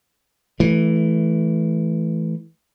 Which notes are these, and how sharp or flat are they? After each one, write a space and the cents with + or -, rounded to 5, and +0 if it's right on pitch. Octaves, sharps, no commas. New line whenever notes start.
E3 +0 A3 -15